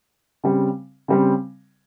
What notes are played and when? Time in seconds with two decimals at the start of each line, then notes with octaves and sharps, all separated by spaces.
0.44 C#3 G3 C4
1.08 C#3 G3 C4